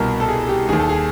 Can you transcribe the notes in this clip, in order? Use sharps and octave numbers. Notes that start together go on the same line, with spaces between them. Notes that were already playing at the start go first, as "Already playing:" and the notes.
Already playing: C2 B2 A#4
A4
G#4
G4
D#2 D#3 G#4
A4
G#4